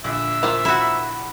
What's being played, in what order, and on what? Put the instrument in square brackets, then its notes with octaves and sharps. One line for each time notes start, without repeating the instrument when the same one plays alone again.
[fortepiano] A#1 D3 [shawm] E5
[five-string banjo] A#3 F4 C5
[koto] E4 F#4